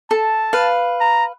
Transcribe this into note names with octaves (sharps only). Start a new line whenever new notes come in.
A4 A5
B4 F5
A#5